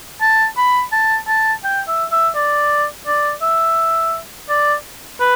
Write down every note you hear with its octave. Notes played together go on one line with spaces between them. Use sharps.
A5
B5
A5
A5
G5
E5
E5
D5
D5
E5
D5
B4